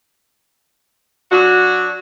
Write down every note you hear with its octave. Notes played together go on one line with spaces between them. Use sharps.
F#3 D4 F#4